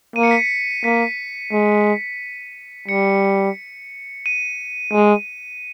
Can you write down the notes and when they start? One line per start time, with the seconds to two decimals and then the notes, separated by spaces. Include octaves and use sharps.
0.16 A#3 D#7
0.23 C#7
0.31 B6
0.38 C#7
0.84 A#3 B6
1.52 G#3
2.88 G3 C#7
4.26 D#7
4.93 G#3